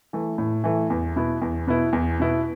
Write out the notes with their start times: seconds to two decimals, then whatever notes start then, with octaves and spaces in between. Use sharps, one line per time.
0.13 E3 A3
0.38 A2
0.64 E3 A3
0.90 E2
1.16 B2 B3 E4
1.42 E2
1.67 B2 B3 E4
1.93 E2
2.20 B2 B3 E4